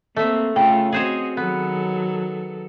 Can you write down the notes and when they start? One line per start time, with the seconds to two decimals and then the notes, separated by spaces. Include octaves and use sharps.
0.16 A3 A#3 C4 E5
0.56 C#3 A3 F4 A4 G5
0.92 C4 F#4 G#4 C5 C#5 D#5
1.37 D#3 F#3 B3 A4